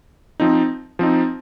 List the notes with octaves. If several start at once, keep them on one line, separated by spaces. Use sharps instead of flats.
F3 C4 D#4
F3 C4 D#4